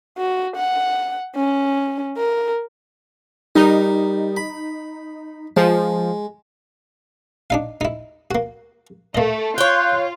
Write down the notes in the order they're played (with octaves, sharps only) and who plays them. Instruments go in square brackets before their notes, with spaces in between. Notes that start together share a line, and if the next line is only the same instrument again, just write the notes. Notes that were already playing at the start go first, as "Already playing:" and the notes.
[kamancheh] F#4
F#5
C#4
A#4
[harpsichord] G3 A#4 [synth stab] D#4
[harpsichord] B5
[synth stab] F3 [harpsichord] G#3
[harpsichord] D4 D#4 F5
D#4 E4
A#3 F#4
[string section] A3 [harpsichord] A#3 D#5
[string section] F4 [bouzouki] C#5 G5 [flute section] F#6 G6